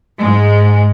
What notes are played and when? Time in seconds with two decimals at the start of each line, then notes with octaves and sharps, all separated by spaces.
0.19 G#2 G#3